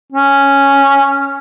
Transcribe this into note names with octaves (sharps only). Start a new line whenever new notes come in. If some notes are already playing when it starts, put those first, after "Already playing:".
C#4